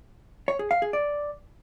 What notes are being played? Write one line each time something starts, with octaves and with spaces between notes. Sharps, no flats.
C#5
G#4
F5
G#4
D5